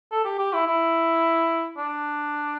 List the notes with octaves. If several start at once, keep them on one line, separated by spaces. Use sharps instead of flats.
A4
G4
G4
E4
E4
D4